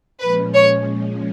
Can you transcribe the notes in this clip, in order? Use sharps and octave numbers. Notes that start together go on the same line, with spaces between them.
A#2 F3 G#3 C#4 B4
C#5